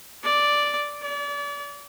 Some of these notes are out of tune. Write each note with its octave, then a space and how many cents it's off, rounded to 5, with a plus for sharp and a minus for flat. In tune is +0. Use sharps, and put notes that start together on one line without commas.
D5 -5
D5 -35